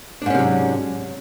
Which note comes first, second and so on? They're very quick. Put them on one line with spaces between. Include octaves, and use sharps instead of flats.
D4 G#2 C#4 C3 F#3